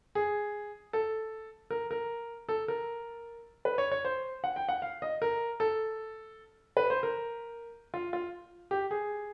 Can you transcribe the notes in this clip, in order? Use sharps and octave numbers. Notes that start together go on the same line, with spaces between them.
G#4
A4
A#4
A#4
A4
A#4
B4
C#5
C#5
C5
F#5
G5
F#5
F5
D#5
A#4
A4
B4
C5
A#4
F4
F4
G4
G#4